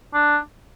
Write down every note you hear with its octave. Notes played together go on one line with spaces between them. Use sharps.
D4